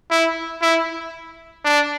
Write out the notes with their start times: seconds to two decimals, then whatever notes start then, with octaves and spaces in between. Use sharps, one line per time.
0.11 E4
0.62 E4
1.64 D4